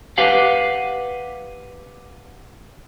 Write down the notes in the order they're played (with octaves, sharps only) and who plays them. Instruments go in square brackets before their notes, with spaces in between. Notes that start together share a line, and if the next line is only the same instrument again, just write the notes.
[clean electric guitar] G4 B4 F5 F#5